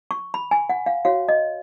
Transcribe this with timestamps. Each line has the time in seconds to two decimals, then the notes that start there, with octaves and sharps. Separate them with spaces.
0.11 C#6
0.34 B5
0.51 G#5
0.69 F#5
0.86 F5
1.05 F#4 C#5 F5
1.29 D#5